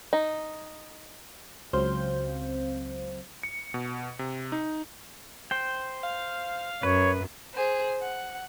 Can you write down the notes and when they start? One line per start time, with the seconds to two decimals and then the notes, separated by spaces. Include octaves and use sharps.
0.13 D#4
1.73 C#2 F#3 C4 C5 F5 G6
3.43 C#7
3.74 B2
4.19 C3
4.52 D#4
5.51 C5 G5
6.03 F5
6.83 F#2 B4 C#5
7.53 G#4 C5
8.02 F#5